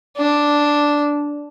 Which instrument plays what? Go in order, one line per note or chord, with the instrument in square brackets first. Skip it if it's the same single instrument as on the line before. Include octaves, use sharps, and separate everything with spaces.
[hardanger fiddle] D4